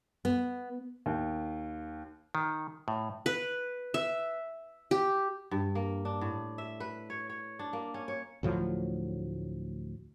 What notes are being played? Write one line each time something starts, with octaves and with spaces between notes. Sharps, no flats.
B3
D#2
D#3
A2
B4
E5
G4
G2
A#3
D4
A2
E5
B4
C#5
C#5
D4
A#3
C#4
C#5
D2 A2 F3 F#3